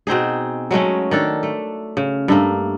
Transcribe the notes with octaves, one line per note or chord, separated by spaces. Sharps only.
B2 C4 D#4 G#4
F#3 G#3 A3 C#4
D#3 D4 A4
A3
C#3
G2 A3 A#3